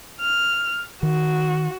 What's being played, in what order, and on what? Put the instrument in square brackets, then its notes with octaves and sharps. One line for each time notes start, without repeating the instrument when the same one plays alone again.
[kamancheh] F6
[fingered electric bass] D#3 [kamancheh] F#4